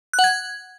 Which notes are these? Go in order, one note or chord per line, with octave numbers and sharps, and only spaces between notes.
F#6
F#5
G#6